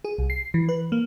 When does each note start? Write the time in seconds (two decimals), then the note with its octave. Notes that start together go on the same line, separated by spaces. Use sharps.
0.04 G#4
0.18 C2
0.30 C7
0.54 E3
0.69 B4
0.92 A#3